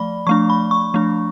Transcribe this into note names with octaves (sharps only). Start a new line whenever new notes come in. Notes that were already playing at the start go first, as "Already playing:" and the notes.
Already playing: F3 A3 D5 B5
F3 A3 D4 C#6
B5
C#6
F3 A3 D4